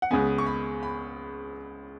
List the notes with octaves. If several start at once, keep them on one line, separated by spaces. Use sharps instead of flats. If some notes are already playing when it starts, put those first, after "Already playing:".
F#5
C#2 C#3 G#3 B3 G#5
C#6
B5
B5